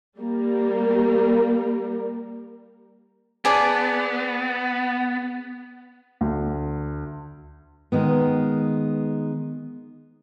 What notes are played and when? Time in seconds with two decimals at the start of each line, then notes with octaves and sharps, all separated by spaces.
0.18 G3 A#3 A#4
3.45 B3 G#4 D5 A5
6.21 D2
7.92 D#3 G#3 B3